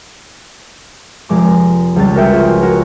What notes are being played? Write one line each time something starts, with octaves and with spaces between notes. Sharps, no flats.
F1 G#3 D6
C#2 G3 A6
F#4 A#4 B4 C#5 E5 G5
F4 G#4
F#4 A#4